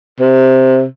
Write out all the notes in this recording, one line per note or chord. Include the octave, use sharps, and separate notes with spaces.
C3